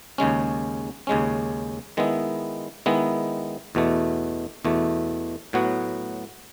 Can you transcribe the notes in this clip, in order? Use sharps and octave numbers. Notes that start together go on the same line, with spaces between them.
D#2 C#3 G#3 C#4
D#2 C#3 G#3 C#4
D#3 G#3 B3 E4
D#3 G#3 B3 E4
E2 B2 A3
E2 B2 A3
A2 F#3 B3 F#4